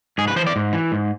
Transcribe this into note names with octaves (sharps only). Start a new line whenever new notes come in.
G#2 G#4
B4
E3 C5
D5
G#2
E3
G#2